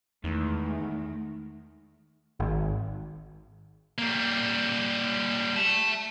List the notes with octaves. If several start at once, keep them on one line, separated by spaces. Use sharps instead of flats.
E2 D#3 G#3 A3
G#1
G3 A#3
E5 A5